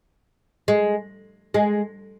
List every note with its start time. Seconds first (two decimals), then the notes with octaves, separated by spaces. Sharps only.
0.68 G#3
1.54 G#3